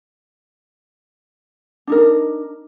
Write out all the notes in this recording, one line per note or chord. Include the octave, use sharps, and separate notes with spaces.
D4 D#4 A#4